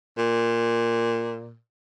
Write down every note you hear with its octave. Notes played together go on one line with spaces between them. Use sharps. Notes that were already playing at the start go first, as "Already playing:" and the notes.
A#2